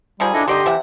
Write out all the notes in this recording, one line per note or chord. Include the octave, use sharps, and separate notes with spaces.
D#3 F3 G3 G#4
D4 E4 A4 D#5
D3 D#3 G4 D5 D#5 C6
C3 E3 E5 F#5